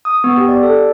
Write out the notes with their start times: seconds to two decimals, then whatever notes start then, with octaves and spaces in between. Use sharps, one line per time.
0.05 D#6
0.24 B3
0.37 G4
0.49 D5
0.63 A4